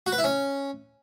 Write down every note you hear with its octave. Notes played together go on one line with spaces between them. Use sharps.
F#4
B4
E4
C#4